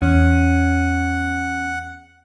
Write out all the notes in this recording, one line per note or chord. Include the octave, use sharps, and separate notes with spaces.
E2 C#4 F#5